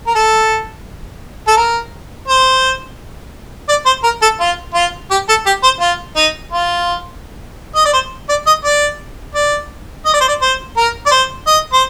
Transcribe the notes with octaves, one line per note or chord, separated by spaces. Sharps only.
A#4
A4
A4
A#4
C5
D5
C5
A#4
A4
F4
F4
G4
A4
G4
C5
F4
D#4
F4
D#5
D5
C5
D5
D#5
D5
D5
D#5
D5
C5
D5
C5
A#4
D5
C5
D#5
C5